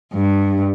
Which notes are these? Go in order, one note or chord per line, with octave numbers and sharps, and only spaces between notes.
G2